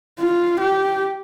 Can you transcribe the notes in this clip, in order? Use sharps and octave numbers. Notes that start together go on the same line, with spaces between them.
F4
G4